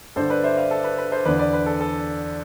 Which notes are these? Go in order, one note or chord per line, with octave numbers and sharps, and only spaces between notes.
G2 D3 A4 C5
B4 D5
C5 E5
D5 F5
A4
B4
B4
A4 C5
E2 D3 B4 D5
B4 D5
B4
A4
A4